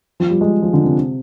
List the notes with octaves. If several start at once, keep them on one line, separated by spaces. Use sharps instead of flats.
F3
G3
G#3
F3
D3
C3